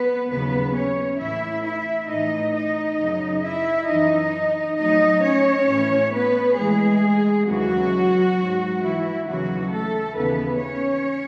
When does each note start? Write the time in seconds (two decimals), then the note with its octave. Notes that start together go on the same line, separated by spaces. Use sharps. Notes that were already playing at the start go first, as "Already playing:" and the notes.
Already playing: B3 B4
0.30 D#2 C#3 F#3 B3 B4
0.74 C#4 C#5
1.19 A2 E3 E4 E5
1.64 E4 E5
2.08 A2 E3 D#4 D#5
2.54 D#4 D#5
2.98 F#2 C#3 F#3
3.43 E4 E5
3.88 F#2 E3 D#4 D#5
4.78 A2 F#3 D#4 D#5
5.22 C#4 C#5
5.68 A2 E3
6.13 B3 B4
6.57 A2 E3 G#3 G#4
7.47 D#2 C#3 E3 F#3 F#4
8.38 G#2 F#3
8.81 E3 E4
9.26 D#2 C#3 E3 F#3 F#4
9.72 A3 A4
10.16 D#2 C#3 E3 B3 B4
10.61 C#4 C#5